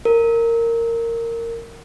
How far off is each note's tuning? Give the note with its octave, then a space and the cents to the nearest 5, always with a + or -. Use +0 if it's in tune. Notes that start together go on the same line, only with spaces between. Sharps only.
A#4 -15